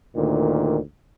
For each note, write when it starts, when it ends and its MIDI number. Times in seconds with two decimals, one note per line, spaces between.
0.16 0.79 38
0.16 0.79 46
0.16 0.79 51